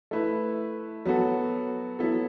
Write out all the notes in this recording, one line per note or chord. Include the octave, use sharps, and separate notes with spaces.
A3 E4 B4
F#3 B3 F#4 A4
F#3 B3 E4 A4